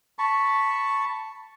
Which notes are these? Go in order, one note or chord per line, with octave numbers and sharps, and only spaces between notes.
A5 B5 C#6